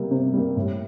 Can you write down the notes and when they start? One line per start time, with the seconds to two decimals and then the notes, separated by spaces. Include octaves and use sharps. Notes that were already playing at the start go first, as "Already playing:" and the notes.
Already playing: C3 G3 A#3
0.11 C3
0.33 G3 A#3
0.57 A2